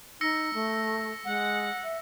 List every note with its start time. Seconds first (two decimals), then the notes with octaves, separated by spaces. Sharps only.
0.21 D#4 E6 A#6 C#7
0.54 A3
1.25 G#3 F#5
1.84 E5